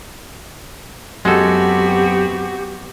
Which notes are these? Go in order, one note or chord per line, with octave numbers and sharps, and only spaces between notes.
F#2 G#3 B3 C4 F#4 G4 A4